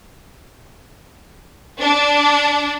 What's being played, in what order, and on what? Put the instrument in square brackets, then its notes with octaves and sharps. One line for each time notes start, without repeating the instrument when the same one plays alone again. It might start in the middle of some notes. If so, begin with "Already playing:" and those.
[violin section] D4